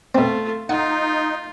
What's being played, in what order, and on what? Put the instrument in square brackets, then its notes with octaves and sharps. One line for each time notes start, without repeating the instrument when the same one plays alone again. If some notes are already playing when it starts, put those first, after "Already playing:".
[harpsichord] B2 C4 [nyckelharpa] A3 F4
[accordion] D#4 [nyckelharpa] F4 [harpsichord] F#5